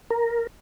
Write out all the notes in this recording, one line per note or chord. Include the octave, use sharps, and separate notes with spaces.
A#4